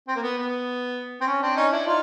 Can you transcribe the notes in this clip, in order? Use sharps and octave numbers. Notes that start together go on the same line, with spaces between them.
C4
A#3
B3
B3
C4
C#4
C4 D4
C#4 D#4
D4 E4
D#4 F4